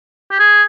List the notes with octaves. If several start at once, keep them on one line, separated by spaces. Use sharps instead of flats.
G4
G#4